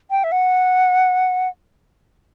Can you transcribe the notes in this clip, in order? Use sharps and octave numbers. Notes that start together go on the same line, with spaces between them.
G5
E5
F#5